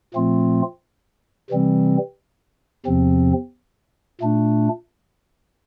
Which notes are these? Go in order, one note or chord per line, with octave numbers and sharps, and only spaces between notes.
A#2 F3 A3 C4 F4
C3 E3 G3 C4
E2 C3 F3 C4
A#2 A3 D4